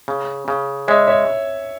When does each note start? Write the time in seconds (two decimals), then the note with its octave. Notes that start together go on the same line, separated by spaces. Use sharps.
0.08 C#3
0.48 C#3
0.88 G#3 C#5 E5
1.07 C#5 E5